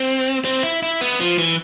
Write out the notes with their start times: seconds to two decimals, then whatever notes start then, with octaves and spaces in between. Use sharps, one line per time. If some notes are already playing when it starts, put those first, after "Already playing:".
Already playing: C4
0.45 C4
0.63 E4
0.83 E4
1.01 B3
1.20 F3
1.38 E3